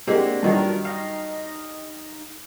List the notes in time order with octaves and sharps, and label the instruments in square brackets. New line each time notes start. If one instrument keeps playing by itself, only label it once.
[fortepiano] G#3 A#3 G4 [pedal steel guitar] C4 D4 F#4
[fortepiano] G2 D#3 F#3 [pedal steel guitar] D4 F4 A#4
[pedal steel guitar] D#4 D#5 F5